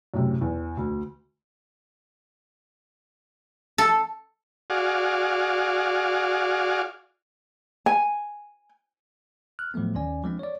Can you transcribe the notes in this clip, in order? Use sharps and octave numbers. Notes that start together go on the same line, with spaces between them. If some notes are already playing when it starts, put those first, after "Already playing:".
F#2 A2 C3
E2
D2
A4
F#4 G#4 D5 F5
G#5
F6 F#6
A2 F3 F#3 A3 B3
D#2 D#3 C#4 D5 G#5
F3 G#3 C4 D4
C#5 D5